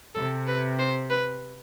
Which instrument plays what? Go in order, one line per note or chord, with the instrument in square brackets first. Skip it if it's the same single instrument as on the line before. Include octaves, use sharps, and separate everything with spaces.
[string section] C3 [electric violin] A4
[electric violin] B4
C5
B4